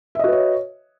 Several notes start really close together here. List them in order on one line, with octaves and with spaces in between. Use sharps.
E5 D#5 F#4 B4 C#5